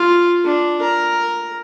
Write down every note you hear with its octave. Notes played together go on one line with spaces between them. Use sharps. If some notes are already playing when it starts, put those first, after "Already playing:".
Already playing: F4
D4
A#4